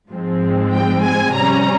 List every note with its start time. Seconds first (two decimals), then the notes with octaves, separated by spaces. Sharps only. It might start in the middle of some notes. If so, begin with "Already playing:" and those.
0.10 G#2 F3 G#3 C4
0.72 G5
1.04 G#5
1.35 C3 G3 C#4 A#5